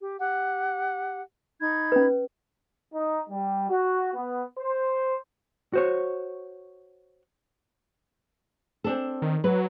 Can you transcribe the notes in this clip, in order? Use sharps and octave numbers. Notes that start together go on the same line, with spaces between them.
G4
G4 F#5
D#4 B5 G#6
C#4 B4
D#4
G3
F#4
B3
C5
F#4 C5 C#5
C4 D4 A4
D#3
F#3 B4